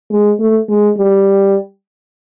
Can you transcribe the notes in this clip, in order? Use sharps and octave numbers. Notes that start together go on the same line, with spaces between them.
G#3
A3
G#3
G3